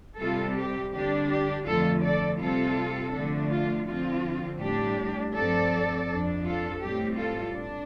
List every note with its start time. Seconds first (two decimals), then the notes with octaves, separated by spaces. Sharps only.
0.19 C3 G3 C4 F4 A4
0.56 G4
0.92 D3 G3 D4 G4
1.30 G4
1.66 F2 D3 A3 F4 A4
2.03 A4 D5
2.40 C3 G3 C4 F4 A4
3.14 D3 F3 A3 D4
3.50 F4
3.87 D3 F3 C4 F4
4.61 A2 G3 D4 G4
5.34 G2 F3 C4 A4 D5
6.08 F2 F3 D4
6.45 F4 A4
6.81 A2 G3 C4 G4
7.18 F4 A4
7.55 D4